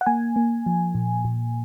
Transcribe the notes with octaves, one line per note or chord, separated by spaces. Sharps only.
F#5
A#3 G#5
A#3
F3
A#2
A#2